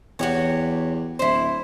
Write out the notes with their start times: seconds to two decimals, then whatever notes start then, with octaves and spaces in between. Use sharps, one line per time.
0.19 E2 F#4 G4 C#5
1.19 D1 E4 C5